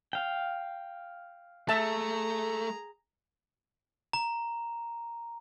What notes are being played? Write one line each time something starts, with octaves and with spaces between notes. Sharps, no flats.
F5 G5
A3 G#4 E5 A5 A#5
A#5